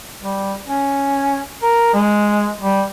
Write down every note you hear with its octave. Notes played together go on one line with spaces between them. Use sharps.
G3
C#4
A#4
G#3
G3